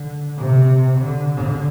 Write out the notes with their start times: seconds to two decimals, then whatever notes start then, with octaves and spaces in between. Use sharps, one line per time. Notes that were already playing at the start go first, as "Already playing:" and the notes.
Already playing: D3
0.38 C3
1.00 D3
1.31 D3